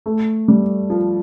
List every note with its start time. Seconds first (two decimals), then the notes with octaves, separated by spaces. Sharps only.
0.06 A3
0.48 G3
0.90 F3